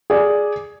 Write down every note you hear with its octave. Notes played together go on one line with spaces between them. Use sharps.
G#4 D5